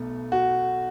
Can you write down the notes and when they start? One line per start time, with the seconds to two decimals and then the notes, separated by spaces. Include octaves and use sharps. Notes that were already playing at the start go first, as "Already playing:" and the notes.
Already playing: B1 B2 A3
0.32 F#4